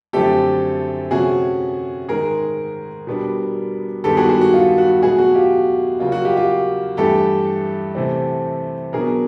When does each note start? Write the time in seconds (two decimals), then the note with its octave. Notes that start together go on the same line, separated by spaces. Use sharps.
0.13 F#2 D3 F3 A3 C4 G4 A4
1.11 C3 F3 A3 C#4 F#4 G#4
2.09 G#2 D#3 G#3 G#4 A#4
3.07 B2 G3 B3 D4
4.04 G2 D#3 G#3 B3 G4 A4
4.17 F#4 G#4
4.29 F#4 G#4
4.41 F#4
4.54 F4
4.78 F#4
5.03 B2 F#3 A3 F#4 G#4
5.18 F#4
5.34 F4 G4
5.99 C#3 F#3 A#3 F4
6.12 F#4
6.25 F4 G4
6.37 F4 G4
6.97 G2 E3 A3 G4 A4
7.95 C3 E3 A3 C4
8.93 B2 F#3 B3 D4 G#4 A#4